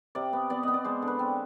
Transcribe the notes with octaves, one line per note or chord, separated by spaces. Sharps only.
C3 D5
B3
B3 D5
B3 D#5
D5
G#3 C5
D3
B4
C4